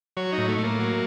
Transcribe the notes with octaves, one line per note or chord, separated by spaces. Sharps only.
F#3 C#5
D#4
A2
A3
A2
A#3
F#3